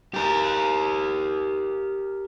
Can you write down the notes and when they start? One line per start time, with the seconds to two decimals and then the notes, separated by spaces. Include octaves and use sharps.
0.14 G4 A#4